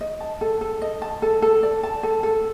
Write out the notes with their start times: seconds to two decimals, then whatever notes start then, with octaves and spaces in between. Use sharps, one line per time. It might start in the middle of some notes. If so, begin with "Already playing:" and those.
0.01 D#5
0.20 A5
0.41 A4
0.61 A4
0.82 D#5
1.02 A5
1.22 A4
1.42 A4
1.63 D5
1.83 A5
2.03 A4
2.23 A4